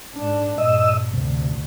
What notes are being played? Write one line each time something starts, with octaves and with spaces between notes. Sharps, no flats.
G#2 D4
G2 A#2 D#5 E6
D2 C3